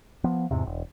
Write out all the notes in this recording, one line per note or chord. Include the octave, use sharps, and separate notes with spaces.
F3 B3
E2 G#2 C3
E1